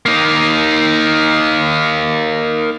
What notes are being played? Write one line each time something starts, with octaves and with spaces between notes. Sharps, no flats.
A#3 D#4